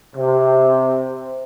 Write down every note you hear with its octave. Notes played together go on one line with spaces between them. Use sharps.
C3